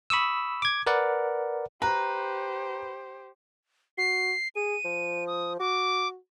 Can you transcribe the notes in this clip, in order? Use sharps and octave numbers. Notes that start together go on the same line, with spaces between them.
B5 C#6 D#6 E6
D6 G#6
A#4 B4 D5 F#5
G4 B4 C5 A#5
F#4 C7
G#4 D#7
F3
D#6
F#4 D6